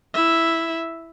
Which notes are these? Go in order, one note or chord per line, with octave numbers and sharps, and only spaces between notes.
E4 E5